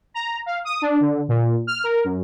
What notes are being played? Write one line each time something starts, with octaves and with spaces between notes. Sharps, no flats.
A#5
F5
D#6
D4
D3
A#2
F6
A#4
F#2